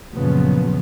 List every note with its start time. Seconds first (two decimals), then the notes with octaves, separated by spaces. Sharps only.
0.13 F#2 A#2 C#3 F3 B3